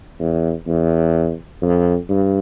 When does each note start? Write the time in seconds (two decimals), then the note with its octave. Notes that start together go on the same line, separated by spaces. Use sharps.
0.19 E2
0.67 E2
1.62 F2
2.09 G2